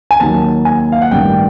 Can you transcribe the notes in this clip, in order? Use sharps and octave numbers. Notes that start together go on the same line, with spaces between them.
G#5
D#2 D#3 F#3 A5
G#5
F5
F#5
A1 G2 D#3 G3 G5